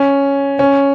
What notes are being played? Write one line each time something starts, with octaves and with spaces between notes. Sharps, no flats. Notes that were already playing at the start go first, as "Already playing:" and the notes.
Already playing: C#4
C#4